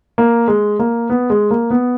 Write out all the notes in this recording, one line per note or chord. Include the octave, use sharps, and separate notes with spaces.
A#3
G#3
A#3
B3
G#3
A#3
B3